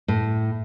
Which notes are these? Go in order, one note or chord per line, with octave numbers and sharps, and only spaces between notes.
A2